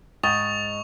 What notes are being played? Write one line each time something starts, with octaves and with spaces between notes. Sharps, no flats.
G#2 G#3 G5 C#6 D#6 A6 F7